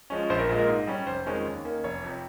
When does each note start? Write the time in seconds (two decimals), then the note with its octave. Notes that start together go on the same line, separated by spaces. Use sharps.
0.10 F3 G#3 C#4
0.30 A#1 C5
0.39 A#4
0.49 A#2 G#3
0.59 A#4
0.68 G#2
0.87 G3 C#4
1.06 F1 C5
1.26 F2 D#3 G#3 C#4
1.46 D#2
1.65 D#3 A#3 C#4
1.83 F1 C#5
2.03 F2 C3